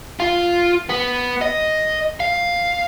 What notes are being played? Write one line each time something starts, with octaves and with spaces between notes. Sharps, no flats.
F4
B3
D#5
F5